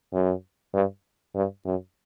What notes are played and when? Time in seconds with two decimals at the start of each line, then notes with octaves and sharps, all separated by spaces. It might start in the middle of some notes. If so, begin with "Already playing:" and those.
0.13 F#2
0.74 G2
1.35 G2
1.65 F#2